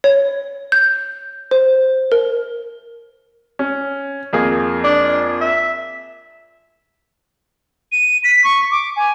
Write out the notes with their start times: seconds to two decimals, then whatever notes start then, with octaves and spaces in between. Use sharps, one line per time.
0.04 C#5
0.72 G6
1.51 C5
2.12 A#4
3.59 C#4
4.33 F2 A#3 G#4
4.84 D4
5.41 E5
7.92 D#7
8.24 B6
8.44 C#6
8.71 D6
8.96 G#5